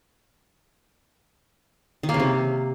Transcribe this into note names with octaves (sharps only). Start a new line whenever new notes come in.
D#3
A#3
C#3
C3